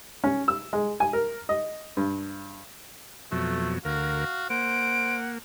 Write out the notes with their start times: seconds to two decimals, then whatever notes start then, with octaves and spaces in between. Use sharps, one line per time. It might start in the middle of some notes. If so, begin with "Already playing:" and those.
0.24 C#4
0.48 E6
0.73 G#3
1.00 G#5
1.13 A#4
1.49 D#5
1.97 G2
3.32 F2 B2 F#3 A3
3.85 D2 F#4 A#4 F5
4.50 A#3 C5 F#5 D7